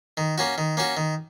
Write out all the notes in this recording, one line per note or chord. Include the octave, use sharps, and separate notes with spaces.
D#3
A#3 C#4 F#4
D#3
A#3 C#4 F#4
D#3